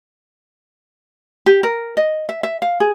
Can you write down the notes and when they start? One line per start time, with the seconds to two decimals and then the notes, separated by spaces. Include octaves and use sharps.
1.46 G4
1.63 A#4
1.97 D#5
2.29 E5
2.43 E5
2.62 F5
2.80 G#4